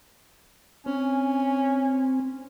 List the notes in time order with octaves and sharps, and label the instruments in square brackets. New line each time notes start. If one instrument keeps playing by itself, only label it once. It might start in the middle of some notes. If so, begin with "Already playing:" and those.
[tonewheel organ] C4 [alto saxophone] C#4 [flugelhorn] G#5